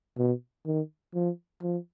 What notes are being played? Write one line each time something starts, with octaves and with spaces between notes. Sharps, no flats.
B2
D#3
F3
F3